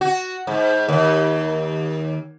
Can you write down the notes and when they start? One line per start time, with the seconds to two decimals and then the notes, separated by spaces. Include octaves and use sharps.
0.01 F#4
0.47 G#2
0.89 D#2